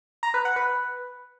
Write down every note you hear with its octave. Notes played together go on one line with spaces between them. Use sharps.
A#5
B4
F#5
B4